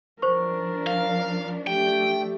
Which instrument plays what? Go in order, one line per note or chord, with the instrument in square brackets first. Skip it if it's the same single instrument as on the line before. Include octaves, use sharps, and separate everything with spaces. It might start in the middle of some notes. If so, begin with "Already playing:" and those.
[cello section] F3 D4 [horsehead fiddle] A#4 [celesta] C5 C#6
[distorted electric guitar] F5
[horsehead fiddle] A3 G4 [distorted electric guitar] G5